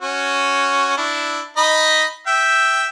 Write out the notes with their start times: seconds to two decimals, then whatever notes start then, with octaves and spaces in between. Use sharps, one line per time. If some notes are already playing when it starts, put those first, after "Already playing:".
0.02 C#4 F#4
0.97 D4 E4
1.57 D#4 D#5 B5
2.27 E5 G5